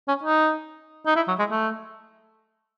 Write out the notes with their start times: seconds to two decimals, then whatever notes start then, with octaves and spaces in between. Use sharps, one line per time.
0.08 C#4
0.23 D#4
1.06 D#4
1.16 E4
1.28 F#3
1.39 G#3
1.51 A3